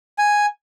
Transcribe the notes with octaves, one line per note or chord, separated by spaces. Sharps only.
G#5